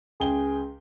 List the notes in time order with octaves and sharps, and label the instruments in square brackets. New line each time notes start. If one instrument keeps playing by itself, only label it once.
[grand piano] C#2 G5 G7 [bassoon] G#4